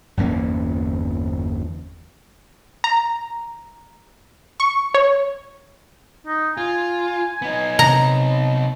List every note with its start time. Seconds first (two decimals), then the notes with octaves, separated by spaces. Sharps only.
0.17 G1 E2 A#3 C#4
2.84 A#5
4.60 C#6
4.94 C#5
6.27 D#4
6.57 F4 G#5
7.42 B3 D#4
7.79 C3 A#5